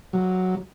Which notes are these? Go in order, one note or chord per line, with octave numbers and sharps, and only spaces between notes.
F#3